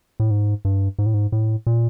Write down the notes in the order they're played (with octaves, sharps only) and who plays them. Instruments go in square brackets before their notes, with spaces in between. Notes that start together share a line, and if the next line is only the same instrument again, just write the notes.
[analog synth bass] A2
G#2
G2
G#2
A2
G#2
A2
A#2